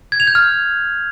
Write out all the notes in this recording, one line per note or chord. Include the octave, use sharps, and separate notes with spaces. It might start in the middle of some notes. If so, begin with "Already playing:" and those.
G#6
F7
G6
F6